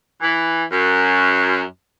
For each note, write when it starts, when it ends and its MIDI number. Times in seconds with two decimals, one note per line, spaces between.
0.20 0.63 52
0.71 1.62 42